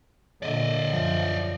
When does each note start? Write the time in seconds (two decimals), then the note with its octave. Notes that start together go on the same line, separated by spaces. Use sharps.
0.42 A#2 D3 D5 D#5
0.90 F#2 F3